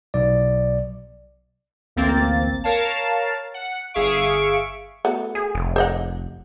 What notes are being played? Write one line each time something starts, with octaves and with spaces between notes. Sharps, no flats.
B1 D5
A1 D2 A#3 C4 A6
A#4 C#5 F5 A5
F#5
G1 G#4 E5 F5 C#6 D7
A3 B3 F#4
G#4
F1
C5 D#5 F#5